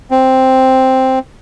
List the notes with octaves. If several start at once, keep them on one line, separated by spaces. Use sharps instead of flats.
C4